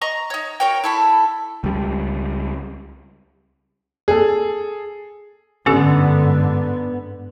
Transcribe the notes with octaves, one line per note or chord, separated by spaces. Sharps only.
D#5 A#5 C#6
D#4 C#5
F#4 A#4 C#5 G5
E4 A4 B5
C#2 G3
G#4 A4
G1 G#2 D3 B3 C#4 G4 A4